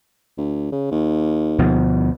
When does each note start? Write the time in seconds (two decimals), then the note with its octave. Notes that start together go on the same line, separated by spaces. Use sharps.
0.38 D2
0.72 C#3
0.91 D#2
1.59 D2 B2 F3